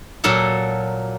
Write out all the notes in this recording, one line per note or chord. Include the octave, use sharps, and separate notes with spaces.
A#2 F#3 A#3 A4 A5